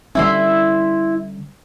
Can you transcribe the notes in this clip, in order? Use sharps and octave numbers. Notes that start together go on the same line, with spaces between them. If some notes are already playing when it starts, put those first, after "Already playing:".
D3 G3 C#4 E4 E5 C6